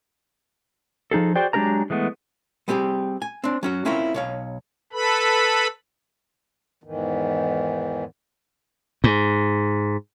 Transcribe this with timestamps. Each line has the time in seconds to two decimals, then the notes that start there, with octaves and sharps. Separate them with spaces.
1.11 F3 D#4 G#4 A4
1.36 F#4 G#4 C5 D5 G5
1.53 F#3 G#3 D4 G4 A#4 A#5
1.90 E3 G#3 A3 B3
2.68 G3 B3 C4 G4 G#4
3.22 G#5
3.44 C4 D4
3.63 F#3 C#4 F#4
3.85 C4 C#4 E4 F4 A#4 C#5
4.14 B1 C#5 F5
4.93 A4 B4 B5
6.84 E2 G#2 D#3 E3
9.04 G#2